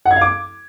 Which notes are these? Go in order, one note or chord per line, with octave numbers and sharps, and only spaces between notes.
F#5
G#6
F5
D6